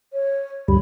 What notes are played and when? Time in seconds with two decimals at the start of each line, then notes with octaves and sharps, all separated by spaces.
0.13 C#5
0.68 D2 G2 G3 B5